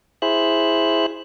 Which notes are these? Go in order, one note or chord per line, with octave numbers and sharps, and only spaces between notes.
E4 G#4 C5 E5 F#6